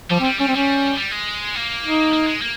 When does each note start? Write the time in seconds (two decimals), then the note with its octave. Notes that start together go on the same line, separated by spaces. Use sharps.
0.10 F3 G3
0.20 C4
0.25 G3
0.39 G3 C#4
0.48 C4
0.54 G3 C#4
0.98 G3
1.11 G#3
1.55 A#3
1.84 D#4
2.13 A#3
2.27 G#3
2.42 A#3